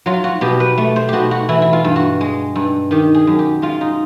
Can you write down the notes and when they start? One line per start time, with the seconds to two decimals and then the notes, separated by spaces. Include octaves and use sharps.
0.06 F#3 F4
0.24 F#4
0.41 B2 G4
0.60 B4
0.78 A3
0.96 C5
1.08 B2 F#4 G4
1.31 F#4
1.49 E3 E4
1.62 E4
1.73 F4
1.84 G2
1.96 F#4
2.21 G#3
2.55 G2
2.91 D#3 G4
3.14 G#4
3.27 F#2
3.39 G4
3.62 G#3 F4
3.81 D#4